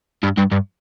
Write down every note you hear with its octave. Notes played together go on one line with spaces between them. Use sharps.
G2
G2
G2